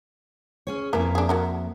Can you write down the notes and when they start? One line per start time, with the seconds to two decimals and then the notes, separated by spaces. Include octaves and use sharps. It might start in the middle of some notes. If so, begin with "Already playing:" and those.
0.67 C#4 G#4 C#5
0.93 F2 E3 A#3 G4 A#4 E5
1.15 D4 G#4
1.29 F#3 F#4 A#4